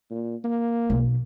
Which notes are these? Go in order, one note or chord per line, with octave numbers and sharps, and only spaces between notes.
A#2
A#3
B1